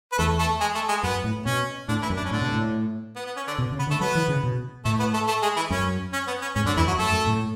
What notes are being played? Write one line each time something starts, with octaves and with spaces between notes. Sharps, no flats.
B4
E2 A3 A4
A3 A4
G#3 G#4
A3 A4
G#3 G#4
F#2 B3
A2
B2 C#4
A2 D3 D4
E3 E4
F#2
D4
C#4
A2 D3 D4
B2
A2
B3
B3
C#4
D3 D4
B2
C#3
B3 B4
D3
A3 A4
F#3 B3 B4
E3
C#3
B2
A2 A3 A4
B3 B4
A3 A4
A3 A4
G#3 G#4
E3 E4
F#2 C#4
C#4
B3
C#4
G#2 C#4
F#2 D3 D4
E2 E3 E4
F#2 F#3 F#4
F#2 A3 A4
F#2
A2